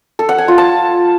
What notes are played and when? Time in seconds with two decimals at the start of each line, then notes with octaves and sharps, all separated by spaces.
0.19 A4
0.29 F#5
0.38 G#5
0.48 F4
0.58 A5